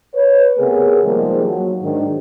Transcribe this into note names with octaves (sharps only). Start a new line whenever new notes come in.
B4 C#5
C3 A3 B3 G#4 A#4
D#3 F3 G3 G#3 A#3 D#4
F#3
G#2 D#3 D4